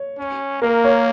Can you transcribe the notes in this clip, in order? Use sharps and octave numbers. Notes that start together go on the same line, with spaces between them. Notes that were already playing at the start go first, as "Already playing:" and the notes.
Already playing: C#5
C#4
A#3 A#4
C#5